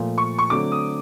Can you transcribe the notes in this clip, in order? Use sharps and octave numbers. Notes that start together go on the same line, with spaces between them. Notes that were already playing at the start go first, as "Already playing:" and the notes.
Already playing: A#2 F3 A3
C#6
C#6
D3 F#3 A3 C4 D6
D#6